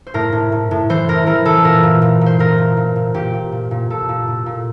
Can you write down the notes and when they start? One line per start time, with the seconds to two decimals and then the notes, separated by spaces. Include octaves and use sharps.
0.07 C5
0.14 A2 A#4
0.32 A2
0.52 A2
0.71 A2
0.89 E3 C5
1.08 A2 A#4
1.26 E3 A#4
1.45 E3 A4
1.64 A#2 A#4
1.83 A#2
2.02 A#2
2.21 A#2 C5
2.39 A#2 A#4
2.58 A#2
2.77 A#2
2.96 A#2
3.14 A#2 G4
3.33 A#2
3.52 A#2
3.71 A#2
3.90 A#2 A4
4.09 A#2
4.28 A#2
4.46 A#2